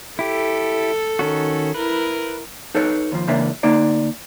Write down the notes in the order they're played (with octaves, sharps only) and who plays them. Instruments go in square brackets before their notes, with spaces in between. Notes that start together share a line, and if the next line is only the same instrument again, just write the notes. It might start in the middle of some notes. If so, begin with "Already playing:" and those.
[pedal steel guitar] E4 G4 [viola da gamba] A4
[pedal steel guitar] D#3 C#4 F#4
[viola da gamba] E4 A#4 [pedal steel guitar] B4
[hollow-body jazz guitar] D#4 A4 B4 C#5
D#2 F3
C#2 C#3 E3 A#3 D4 E5
D2 D3 A#3 D#4 D5